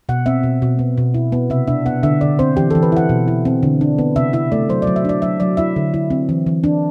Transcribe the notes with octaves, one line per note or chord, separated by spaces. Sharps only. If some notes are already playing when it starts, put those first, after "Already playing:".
B2 F#5
C4 E5
B2
B2
B3
B2
E4
B3
C3 E5
D4 E5
B3 F#5
D3 E5
D3 D5
C4 C5
E3 G4
E3 A4
B4
E4 F#5
B2
E4
C4
D3
D4
B3
C3 E5
E4 E5
A3 D5
F#3 C5
F#3 D5
E5
D4 D5
F#3 E5
F#3 D5
E4 E5
D3
E4
C4
E3
E3
D4